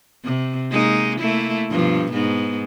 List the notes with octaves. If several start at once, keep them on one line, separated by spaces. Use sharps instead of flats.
C3
G#3 A#3 D#4
A3 A#3 E4
G2 B2 F3
G#2 B3